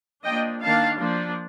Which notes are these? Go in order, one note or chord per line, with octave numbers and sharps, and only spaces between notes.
F3 A#3 D4 D#5 G5
D#3 A#3 D4 F5 A5
F3 A#3 D4